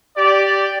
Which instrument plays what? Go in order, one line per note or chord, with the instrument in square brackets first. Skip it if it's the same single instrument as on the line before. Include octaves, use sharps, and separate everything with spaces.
[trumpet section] G4 D5